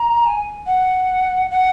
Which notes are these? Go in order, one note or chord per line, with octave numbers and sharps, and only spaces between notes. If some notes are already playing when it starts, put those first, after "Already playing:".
Already playing: A#5
G#5
F#5
F#5